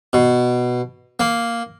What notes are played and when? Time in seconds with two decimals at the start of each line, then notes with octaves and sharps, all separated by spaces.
0.13 B2
1.20 A#3